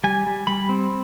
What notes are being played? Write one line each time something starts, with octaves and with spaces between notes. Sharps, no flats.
G3 G#5
G3
G3 B5
C4